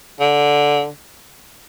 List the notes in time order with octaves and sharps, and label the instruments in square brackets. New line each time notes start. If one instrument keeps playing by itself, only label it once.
[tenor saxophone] D3